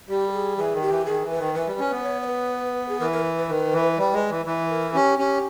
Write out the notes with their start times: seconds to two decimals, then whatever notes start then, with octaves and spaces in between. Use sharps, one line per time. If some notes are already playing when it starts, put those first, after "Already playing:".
0.09 G3 G4
0.29 A#4
0.32 G#4
0.57 E3 G#4
0.73 D#3
0.82 G4
0.89 E3
1.06 D#3 G#4
1.22 E3
1.30 B4
1.38 D#3
1.55 E3 B4
1.67 G3
1.79 C#4 B4
1.91 B3
2.03 C#5
2.22 C#5
2.27 B4
2.89 G#4
3.00 E3 A#4
3.12 A#4
3.24 B4
3.37 B4
3.48 D#3
3.73 E3
3.98 G3
4.13 G#3
4.30 E3
4.46 E3 B4
4.70 A#4
4.94 C#4 G4
5.19 C#4 G4